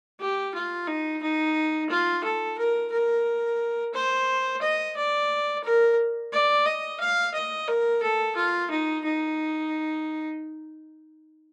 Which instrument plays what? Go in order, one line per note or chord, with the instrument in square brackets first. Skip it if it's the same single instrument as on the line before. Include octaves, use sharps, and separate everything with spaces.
[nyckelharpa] G4
F4
D#4
D#4
F4
A4
A#4
A#4
C5
D#5
D5
A#4
D5
D#5
F5
D#5
A#4
A4
F4
D#4
D#4